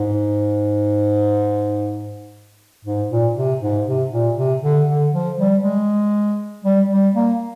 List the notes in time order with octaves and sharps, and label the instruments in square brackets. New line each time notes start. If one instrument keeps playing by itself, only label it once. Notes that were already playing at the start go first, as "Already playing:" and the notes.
Already playing: [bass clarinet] G#2
G#2
A#2
C3
G#2
C3
A#2
C3
D3
D3
F3
G3
G#3
G3
G3
A#3